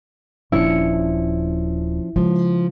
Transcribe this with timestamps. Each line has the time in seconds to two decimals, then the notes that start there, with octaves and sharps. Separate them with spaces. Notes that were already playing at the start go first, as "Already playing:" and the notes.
0.52 D#1 F3 C#4 D4 E4 C#7
2.16 C#3 F3 G#3